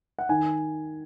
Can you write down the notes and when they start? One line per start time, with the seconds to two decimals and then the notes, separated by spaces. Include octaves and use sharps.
0.19 F#5
0.29 D#3 G#5